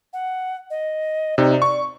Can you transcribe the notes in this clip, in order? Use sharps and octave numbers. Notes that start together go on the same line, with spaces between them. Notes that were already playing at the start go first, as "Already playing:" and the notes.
F#5
D#5
C3 D#4 D5
C#6